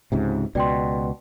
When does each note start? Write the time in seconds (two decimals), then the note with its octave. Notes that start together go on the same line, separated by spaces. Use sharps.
0.12 C#2 G#2 C3
0.55 C#2 B2 D5 G5 C6